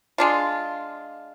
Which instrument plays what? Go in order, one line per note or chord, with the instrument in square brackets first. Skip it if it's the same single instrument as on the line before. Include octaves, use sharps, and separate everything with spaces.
[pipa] G#3 D4 F4